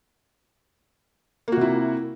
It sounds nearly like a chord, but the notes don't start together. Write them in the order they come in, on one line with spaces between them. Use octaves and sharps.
A#3 F#4 C3 E4